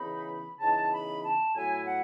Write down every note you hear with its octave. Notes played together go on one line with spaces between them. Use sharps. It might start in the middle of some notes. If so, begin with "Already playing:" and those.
Already playing: C#3 E3 B3 D#4 B5
C#3 E3 B3 D#4 A5
B5
A5
A2 F#3 B3 E4 G#5
F#5